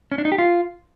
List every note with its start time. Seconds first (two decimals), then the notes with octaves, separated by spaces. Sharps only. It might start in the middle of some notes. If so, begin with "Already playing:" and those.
0.12 C#4
0.18 D4
0.25 D#4
0.32 G4
0.38 F4